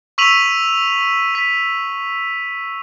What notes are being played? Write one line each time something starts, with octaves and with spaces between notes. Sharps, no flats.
C#6 E6 B6 D#7 F7 F#7
B6